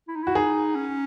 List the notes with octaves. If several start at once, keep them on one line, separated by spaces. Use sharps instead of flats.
E4
D#4
E4 F#4
D#4 G#4
C#4